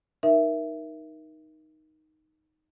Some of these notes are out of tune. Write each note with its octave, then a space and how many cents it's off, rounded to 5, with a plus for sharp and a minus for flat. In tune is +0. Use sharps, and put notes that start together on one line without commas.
D#4 +0 A#4 +25 E5 +5